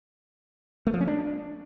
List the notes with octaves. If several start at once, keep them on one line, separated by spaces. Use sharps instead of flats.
A3
F3
C#4
D4